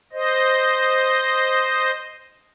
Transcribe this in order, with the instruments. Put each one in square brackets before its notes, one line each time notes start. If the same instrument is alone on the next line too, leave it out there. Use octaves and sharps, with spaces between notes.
[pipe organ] C5 D#5